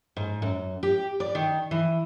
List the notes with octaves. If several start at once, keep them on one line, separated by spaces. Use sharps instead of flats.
G#2
F#2
G4
D5
D#3
E3